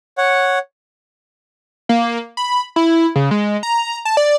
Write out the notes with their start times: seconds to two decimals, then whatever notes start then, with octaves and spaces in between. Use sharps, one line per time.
0.18 C#5 F#5
1.89 A#3
2.37 B5
2.76 E4
3.15 C#3
3.31 G#3
3.63 A#5
4.05 A5
4.17 D5